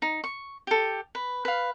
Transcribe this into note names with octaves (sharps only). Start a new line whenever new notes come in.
D#4
C#6
G4 A4
B4
B4 F5